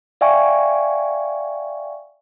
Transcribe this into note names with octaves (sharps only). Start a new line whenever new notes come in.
D5 E5 F5 G5 G#5 C#6